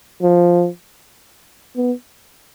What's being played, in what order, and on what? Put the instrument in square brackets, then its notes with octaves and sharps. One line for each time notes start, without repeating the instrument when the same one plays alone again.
[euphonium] F3
B3